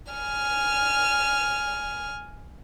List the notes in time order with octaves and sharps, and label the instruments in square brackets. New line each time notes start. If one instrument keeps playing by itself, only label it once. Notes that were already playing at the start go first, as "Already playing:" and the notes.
[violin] G#5 F6